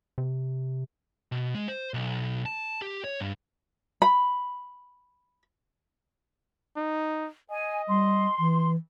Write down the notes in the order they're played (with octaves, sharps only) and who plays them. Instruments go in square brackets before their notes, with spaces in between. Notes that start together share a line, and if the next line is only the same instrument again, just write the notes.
[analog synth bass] C3
[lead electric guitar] B2
G#3
C5
B1
A5
G4
C#5
G2
[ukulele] B5
[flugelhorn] D#4
[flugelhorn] D#5 [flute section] G#5
[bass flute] G3 [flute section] C6
[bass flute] E3